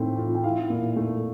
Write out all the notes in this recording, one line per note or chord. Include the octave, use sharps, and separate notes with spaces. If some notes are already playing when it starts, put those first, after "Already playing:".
Already playing: A2 C4
F4
G5
E4 F5
A#2
A3